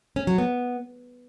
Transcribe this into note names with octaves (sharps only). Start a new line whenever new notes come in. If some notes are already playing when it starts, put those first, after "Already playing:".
C#4
F#3
B3